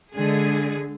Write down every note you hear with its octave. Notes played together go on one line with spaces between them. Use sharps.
D3 G#3 G#4